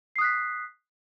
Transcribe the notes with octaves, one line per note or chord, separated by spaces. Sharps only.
D#6 F#6 B6 C7